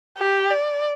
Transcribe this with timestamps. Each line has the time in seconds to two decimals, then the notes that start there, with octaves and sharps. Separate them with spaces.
0.18 G4
0.51 D5